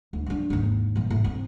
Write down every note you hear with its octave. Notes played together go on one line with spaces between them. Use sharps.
D2
F#3 D4
G#1 D#2
A#2 E3
A2
C4